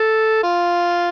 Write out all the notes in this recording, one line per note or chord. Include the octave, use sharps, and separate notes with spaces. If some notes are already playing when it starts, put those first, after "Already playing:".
Already playing: A4
F4